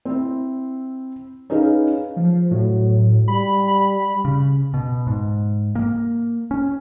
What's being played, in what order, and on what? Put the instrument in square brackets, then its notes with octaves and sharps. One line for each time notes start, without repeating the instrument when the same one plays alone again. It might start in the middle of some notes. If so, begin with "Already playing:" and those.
[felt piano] C4 E4
C#4 D#4 G#4 B4 D#5 F5
[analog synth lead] F3
[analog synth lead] A2 [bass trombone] F#3
[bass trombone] G3 [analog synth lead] B5
[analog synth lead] B5
[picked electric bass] C#3
B2
G#2
A#3
C#4